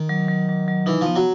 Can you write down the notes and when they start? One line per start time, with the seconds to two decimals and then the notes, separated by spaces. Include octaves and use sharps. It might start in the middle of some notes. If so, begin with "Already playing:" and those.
Already playing: D#3
0.09 F#3
0.28 F#3
0.49 F#3
0.68 F#3
0.86 E3 D#4
1.01 F3 B3
1.16 F#3